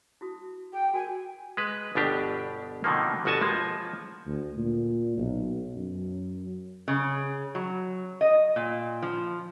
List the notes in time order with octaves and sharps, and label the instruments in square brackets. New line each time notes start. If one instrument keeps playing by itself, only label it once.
[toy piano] E4 F#4 D#6
[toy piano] G#4 [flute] G5
[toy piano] F#4 A#4 G5 [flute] G#5
[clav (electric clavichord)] G#3 B4
G1 B2 D4 G4
B2 D3 D#3 F3 A#3
G1 B2 F#4 G#5 A5
F3 G#3 A#3
[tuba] D2
A#2
B1
F#2
[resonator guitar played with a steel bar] C#3
F#3
D#5
A#2
F3